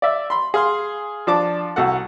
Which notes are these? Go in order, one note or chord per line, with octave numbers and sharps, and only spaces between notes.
D5 E5
B5 C6
G#4 F5 C6
F3 D4 A5 D6
C2 F#4 A4 F#5